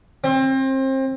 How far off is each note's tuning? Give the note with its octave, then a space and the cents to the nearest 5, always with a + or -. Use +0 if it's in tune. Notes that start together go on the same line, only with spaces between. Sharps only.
C4 +30